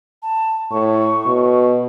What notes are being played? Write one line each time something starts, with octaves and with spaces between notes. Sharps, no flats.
A5
A2 C#6
B2